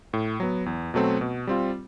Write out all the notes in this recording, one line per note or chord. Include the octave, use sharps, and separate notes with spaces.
A2
F#3 B3
E2
B2 F#3 A3 C4
B2
G3 C4 F4